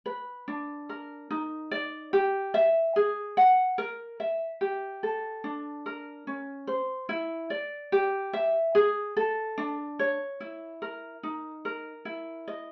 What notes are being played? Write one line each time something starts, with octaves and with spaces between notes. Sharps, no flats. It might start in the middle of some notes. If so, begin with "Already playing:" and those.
B4
D4
A#4
D#4
D5
G4
E5
G#4
F#5
A#4
E5
G4
A4
D4
A#4
C#4
C5
E4
D5
G4
E5
G#4
A4
D4
C#5
E4
A#4
D#4
A#4
E4
D#5